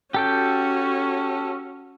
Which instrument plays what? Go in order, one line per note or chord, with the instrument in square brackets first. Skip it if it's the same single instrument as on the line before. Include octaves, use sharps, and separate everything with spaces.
[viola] C#4 F#4 [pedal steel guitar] G4 A4 G5